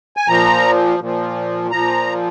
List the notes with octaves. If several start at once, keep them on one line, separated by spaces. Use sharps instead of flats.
G#5
A#2 F3 A#5
A#2 F3
A#2 F3 A#5